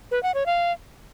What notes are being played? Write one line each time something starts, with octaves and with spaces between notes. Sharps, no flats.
B4
F#5
C#5
F5